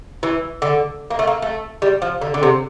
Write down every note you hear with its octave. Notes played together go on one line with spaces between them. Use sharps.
E3
D3
A#3
A3
A#3
A3
G3
F3
D3
D3
C3